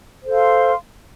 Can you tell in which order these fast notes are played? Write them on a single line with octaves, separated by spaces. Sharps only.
C5 A4 F5 C6